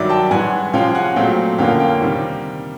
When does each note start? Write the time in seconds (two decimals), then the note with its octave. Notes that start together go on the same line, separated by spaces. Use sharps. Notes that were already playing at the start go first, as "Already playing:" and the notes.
Already playing: G2 D#3 F#3 D5 E5
0.09 G5 A5
0.31 G2 E3 G#3 F#5 G#5
0.73 C3 F3 G#3 C#4 F5 G5
0.95 F#5 G#5
1.16 A#2 F#3 A3 C4 F5 G5
1.58 F2 D3 F3 A#3 C#4 F5 G5
1.80 F5 G5
2.02 C3 D#3 G3